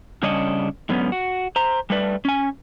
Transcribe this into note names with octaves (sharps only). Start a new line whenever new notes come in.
C#3 G3 C#4 D4 C#5 D#5
G#2 D3 F#3 B3 C#4
F#4
C5 A#5
G3 A3 B4 D5
C#4 G#5